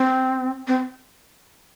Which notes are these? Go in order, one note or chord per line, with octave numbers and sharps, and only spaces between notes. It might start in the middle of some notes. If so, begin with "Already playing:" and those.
Already playing: C4
C4